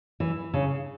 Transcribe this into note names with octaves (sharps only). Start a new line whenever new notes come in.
E3
C#3